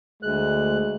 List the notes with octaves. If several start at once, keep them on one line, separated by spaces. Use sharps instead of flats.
D2 G#3 F#6